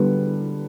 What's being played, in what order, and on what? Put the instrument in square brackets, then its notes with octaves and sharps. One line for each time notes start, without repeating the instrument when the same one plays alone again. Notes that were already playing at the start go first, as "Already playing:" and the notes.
Already playing: [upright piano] D3 G3 B3